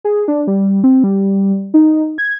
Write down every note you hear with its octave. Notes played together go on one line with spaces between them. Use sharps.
G#4
D4
G3
C4
G3
D#4
G#6